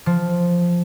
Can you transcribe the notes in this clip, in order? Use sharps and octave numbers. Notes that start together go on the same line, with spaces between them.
F3